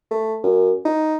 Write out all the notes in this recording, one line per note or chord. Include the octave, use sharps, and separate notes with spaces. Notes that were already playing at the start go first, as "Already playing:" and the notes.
A3
F#2
D#4